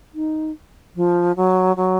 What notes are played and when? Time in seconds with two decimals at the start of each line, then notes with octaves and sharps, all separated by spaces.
0.14 D#4
0.95 F3
1.36 F#3
1.76 F#3